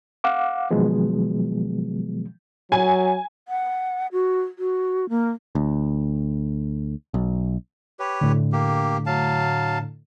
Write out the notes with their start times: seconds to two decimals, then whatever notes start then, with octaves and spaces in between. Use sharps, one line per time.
0.24 F5 F#5 D6
0.71 B2 D#3 F3 F#3 G#3 B3
2.72 F#3 G#5
3.48 F#5
4.12 F#4
4.59 F#4
5.09 A#3
5.55 D2
7.14 B1
7.99 G4 B4 C#5
8.21 A2 D3
8.53 A#3 G4
9.06 F#3 F5 A5